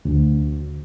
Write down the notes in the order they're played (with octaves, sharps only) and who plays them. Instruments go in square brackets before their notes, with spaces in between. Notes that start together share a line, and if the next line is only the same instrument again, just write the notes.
[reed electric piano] D2